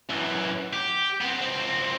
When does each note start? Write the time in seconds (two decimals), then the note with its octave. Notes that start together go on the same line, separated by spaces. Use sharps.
0.10 F#2 E3
0.73 G4
1.21 B3 C4
1.41 C#2 C4